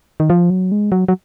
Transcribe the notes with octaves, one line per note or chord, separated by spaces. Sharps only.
D#3
F3
F#3
G#3
F#3
F#3